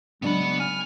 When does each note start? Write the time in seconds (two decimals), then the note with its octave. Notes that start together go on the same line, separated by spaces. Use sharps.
0.22 C#3 F#3 G#3 B3 D4 B5
0.60 G#5 F6